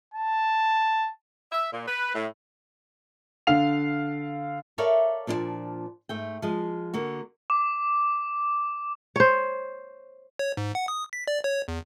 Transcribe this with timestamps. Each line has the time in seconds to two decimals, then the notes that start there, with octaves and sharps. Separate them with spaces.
0.14 A5
1.52 E5
1.73 A#2
1.87 B4
2.15 A2
3.47 D3 F5 C7 F7
4.78 A4 A#4 C#5 D5 E5 F5
5.27 A#2 F3 D4 A#4 D5 A5
6.09 G#2 A3 G5
6.42 F3 G#3
6.94 D3 A#3 F#4
7.50 D6
9.16 C5 C#5
10.39 C#5
10.57 G#2
10.75 F#5
10.88 D#6
11.13 B6
11.28 D5
11.44 C#5
11.68 E2